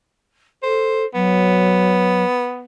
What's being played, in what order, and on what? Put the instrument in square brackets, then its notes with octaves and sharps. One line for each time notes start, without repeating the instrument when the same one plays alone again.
[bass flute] A4 [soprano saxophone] C5
[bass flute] F#3 [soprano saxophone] B3